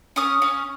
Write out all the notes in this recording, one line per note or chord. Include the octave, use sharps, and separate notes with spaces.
C#4 D#6
C#4